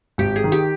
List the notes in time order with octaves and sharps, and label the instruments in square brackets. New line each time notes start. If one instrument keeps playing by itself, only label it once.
[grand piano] G#1 [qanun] G4
[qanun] G#4
[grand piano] D#3
[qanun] G4